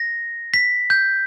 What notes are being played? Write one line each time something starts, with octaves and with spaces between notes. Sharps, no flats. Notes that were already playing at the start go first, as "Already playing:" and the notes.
Already playing: A#6
B6
G6